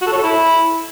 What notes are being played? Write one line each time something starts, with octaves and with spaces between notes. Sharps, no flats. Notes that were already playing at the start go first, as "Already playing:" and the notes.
F#4
A4
C#5
A4
E4